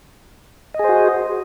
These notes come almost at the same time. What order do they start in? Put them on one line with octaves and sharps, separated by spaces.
D#5 G#4 C5 F#4